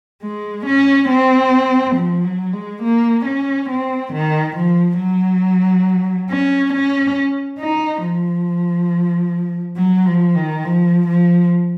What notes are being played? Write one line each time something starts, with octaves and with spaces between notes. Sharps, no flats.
G#3
C#4
C4
F3
F#3
G#3
A#3
C#4
C4
D#3
F3
F#3
C#4
C#4
D#4
F3
F#3
F3
D#3
F3
F3